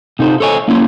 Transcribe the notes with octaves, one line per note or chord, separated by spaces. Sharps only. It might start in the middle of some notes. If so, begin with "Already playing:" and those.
C3 D#4 A4 C5
A4 C5 C#5 D#5 G#5
A#3 C#4 E4 C#5 C6